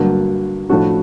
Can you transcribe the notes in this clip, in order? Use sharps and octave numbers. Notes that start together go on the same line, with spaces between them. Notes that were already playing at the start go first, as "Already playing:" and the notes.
Already playing: G2 D3 F#3 A#3 D4
A2 F3 A3 D4 F#4